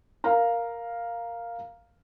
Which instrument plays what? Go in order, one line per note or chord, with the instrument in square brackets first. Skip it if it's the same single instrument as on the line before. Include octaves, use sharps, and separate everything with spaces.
[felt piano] A#4 F5 A#5